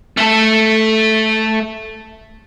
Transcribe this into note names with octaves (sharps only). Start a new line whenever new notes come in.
A3 A4